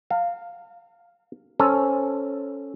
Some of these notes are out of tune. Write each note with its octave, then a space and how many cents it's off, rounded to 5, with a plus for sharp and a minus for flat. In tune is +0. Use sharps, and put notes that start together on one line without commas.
F5 +0 A#5 -45
C#4 +0 A4 +0 C5 +5